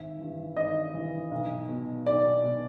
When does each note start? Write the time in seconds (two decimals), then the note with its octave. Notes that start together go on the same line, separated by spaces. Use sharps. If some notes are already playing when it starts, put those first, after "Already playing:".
Already playing: G#1 E5
0.19 G2 E3
0.57 G#1 D#5
0.94 G2 E3
1.31 B1
1.69 B2
2.06 B1 D5
2.44 B2